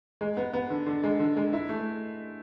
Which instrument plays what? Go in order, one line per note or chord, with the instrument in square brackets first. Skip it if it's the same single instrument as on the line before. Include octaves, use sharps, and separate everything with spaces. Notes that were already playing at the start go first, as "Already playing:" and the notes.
[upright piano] G#3
B3
B3
D3
D3
G#3
D3
G#3
E4
A3